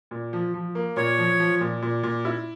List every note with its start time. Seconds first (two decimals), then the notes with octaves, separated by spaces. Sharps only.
0.11 A#2
0.33 F3
0.54 F3
0.75 A#3
0.97 A#2 C#5
1.18 F3
1.40 F3
1.61 A#2
1.82 A#2
2.03 A#2
2.25 E4